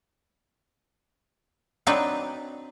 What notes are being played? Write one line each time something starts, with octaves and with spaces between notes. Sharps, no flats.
F#3 C4 D4 D#4 B4